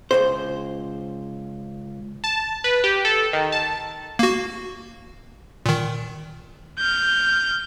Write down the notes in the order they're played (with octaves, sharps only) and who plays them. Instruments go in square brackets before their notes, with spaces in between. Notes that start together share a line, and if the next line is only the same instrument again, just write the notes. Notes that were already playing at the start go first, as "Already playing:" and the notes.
[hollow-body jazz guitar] C#2 G#2 C5
[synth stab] A5
B4
G4
A4
D#3
A5
[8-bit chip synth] A#3 F#4
A#2 D#3
[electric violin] F6 G6